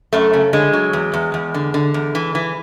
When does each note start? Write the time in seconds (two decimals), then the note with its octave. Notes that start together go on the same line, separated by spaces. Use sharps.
0.13 F#2 A3
0.33 C#3
0.53 D3 G#3
0.73 F#3
0.93 E2
1.14 E2
1.34 E2
1.54 D3
1.74 D3
1.94 E2
2.15 E3
2.35 E3